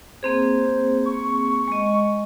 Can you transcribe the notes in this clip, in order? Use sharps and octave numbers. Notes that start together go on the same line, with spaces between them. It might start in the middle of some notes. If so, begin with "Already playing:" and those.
A#3 C4 G#4 C5
C#6
G#3 D#5